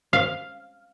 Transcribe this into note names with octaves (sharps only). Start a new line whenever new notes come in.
F5